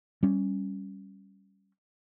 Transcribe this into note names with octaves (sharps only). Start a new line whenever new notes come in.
G3 C#4